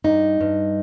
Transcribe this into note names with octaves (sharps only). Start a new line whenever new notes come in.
G2 D#4
G2